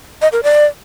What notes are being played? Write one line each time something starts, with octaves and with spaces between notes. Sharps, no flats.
D#5
A#4
D5